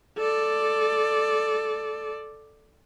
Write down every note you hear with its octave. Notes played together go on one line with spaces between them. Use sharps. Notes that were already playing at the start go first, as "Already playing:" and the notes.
A4 D5